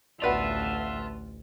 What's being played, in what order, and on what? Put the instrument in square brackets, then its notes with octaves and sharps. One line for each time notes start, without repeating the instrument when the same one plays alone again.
[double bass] A1 D2 [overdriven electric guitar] F4 [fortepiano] F#4 B4 D5 [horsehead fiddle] E5 A5